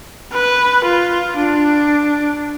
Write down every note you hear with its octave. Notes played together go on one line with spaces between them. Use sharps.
B4
F4
D4